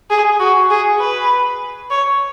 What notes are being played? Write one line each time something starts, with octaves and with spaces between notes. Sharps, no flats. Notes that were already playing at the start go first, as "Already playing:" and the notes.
G#4
F#4
G#4
B4
C#5